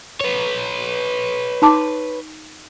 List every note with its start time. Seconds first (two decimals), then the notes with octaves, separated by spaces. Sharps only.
0.20 B4 C#5
1.62 D#4 A5 D6